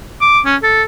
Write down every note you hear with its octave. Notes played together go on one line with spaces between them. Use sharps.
D6
C#4
A4